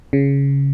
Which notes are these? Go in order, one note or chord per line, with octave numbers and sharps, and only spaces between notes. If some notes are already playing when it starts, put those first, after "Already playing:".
C#3